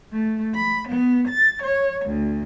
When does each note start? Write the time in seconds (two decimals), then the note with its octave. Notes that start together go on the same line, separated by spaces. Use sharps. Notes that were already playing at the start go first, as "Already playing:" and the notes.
0.12 A3
0.54 B5
0.88 B3
1.27 A6
1.62 C#5
2.04 D2